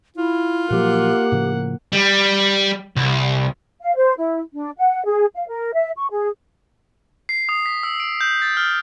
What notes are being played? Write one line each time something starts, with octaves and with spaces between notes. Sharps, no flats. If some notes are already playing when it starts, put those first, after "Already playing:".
E4 F4
A#2 F3 F#3 A#3 G4 F#5
A2 C#3 F3
G3
C2
F5
C5
E4
D4
F#5
G#4
F5
A#4
E5
C#6
G#4
C7
D#6
B6
E6
D7
G6
A6
F6